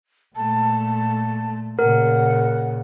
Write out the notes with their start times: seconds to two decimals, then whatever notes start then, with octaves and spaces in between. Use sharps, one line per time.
0.36 A#2 A3 A5
1.79 A#2 C#3 A#4 F#5